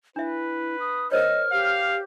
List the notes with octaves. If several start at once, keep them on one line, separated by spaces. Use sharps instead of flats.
D4 E4 B4 E5
D#6
A#4 C5 C#5 D#5 F6
G4 F5